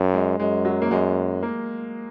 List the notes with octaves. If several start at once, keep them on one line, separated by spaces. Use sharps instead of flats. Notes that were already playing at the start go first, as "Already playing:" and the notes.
Already playing: F#2
G#3
F#2 G#3
F#3
A#3
F#2 G#3
A#3